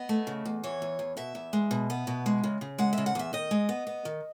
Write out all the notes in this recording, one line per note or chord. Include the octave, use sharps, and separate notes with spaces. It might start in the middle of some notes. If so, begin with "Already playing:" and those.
Already playing: B3 D#5
A3
C#3
E2
E3 C#5
E2
E2
B2 E5
E2
G#3
B2
B3
B2
G#3
C#3
C#3
G#3 F#5
C#3 E5
F#5
E2 E5
D#3 D#5
G#3
B3
B3
D#3